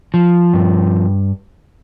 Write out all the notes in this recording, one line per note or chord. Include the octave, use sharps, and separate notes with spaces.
F3
G2